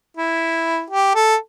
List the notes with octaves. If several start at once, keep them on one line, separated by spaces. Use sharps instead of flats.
E4
G4
A4